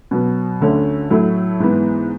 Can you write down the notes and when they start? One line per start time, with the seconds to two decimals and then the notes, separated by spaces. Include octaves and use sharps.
0.11 B2 F#3 B3
0.61 D2 D3 A3 C#4
1.10 A2 F#3 A3 E4
1.60 G#2 E3 B3